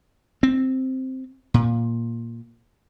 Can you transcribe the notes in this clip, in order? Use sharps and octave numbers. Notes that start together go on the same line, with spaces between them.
C4
A#2